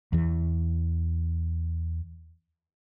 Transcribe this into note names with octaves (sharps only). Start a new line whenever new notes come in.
E2 E3